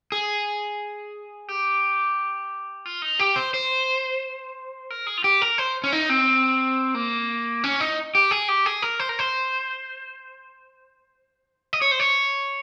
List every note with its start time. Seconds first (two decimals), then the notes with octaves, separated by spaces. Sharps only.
0.12 G#4
1.49 G4
2.85 F4
3.02 D#4
3.19 G4
3.36 C5
3.54 C5
4.90 A#4
5.07 G#4
5.17 F4
5.24 G4
5.42 A#4
5.58 C5
5.84 C#4
5.92 D#4
6.09 C4
6.95 A#3
7.64 C#4
7.80 D#4
8.15 G4
8.31 G#4
8.48 G4
8.66 G#4
8.82 A#4
8.99 C5
9.09 A#4
9.19 C5
11.73 D#5
11.82 C#5
11.91 C5
12.00 C#5